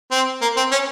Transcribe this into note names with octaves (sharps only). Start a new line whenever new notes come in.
C4
A#3
C4
C#4